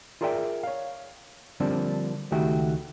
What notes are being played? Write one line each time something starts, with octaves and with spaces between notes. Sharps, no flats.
F4 G#4 A#4 D5 E5 G5
C#5 F5
D3 F3 G3 A#3 C4 D4
C#2 D#3 A3 F#4 G4 E5